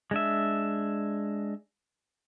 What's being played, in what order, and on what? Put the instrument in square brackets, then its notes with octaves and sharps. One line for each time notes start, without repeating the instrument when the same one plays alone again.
[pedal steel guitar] G#3 D4 E5